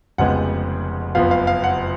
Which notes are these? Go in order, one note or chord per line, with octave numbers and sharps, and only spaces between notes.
F1 F2 C#3 G#3 B3 F#5
F#1 F2 F3 B3 F5
F5
F5
F#5